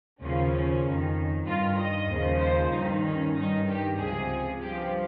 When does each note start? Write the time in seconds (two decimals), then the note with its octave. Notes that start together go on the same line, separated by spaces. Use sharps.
0.21 D#2 C#3 F3 C#4
0.85 F2 D#3
1.47 G2 D#3 F4
1.79 D#5
2.11 D#2 C#3 F3
2.42 C5
2.73 G2 D#3 D#4
3.05 C#4
3.36 G2 D#3 D#4
3.68 G4
3.99 C#2 C3 F3 G#4
4.62 G2 F3 G4